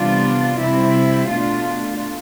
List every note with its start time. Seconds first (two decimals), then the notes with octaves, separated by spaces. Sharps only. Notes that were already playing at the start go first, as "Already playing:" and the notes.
Already playing: C3 E3 G3 B3 D4 F4
0.60 C3 G3 C4 E4
1.30 B2 A3 D4 F4